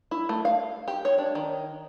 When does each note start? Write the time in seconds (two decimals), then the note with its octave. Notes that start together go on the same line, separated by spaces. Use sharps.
0.11 E4
0.29 A3
0.45 F5
0.88 G4
1.05 C#5
1.18 D4
1.35 D#3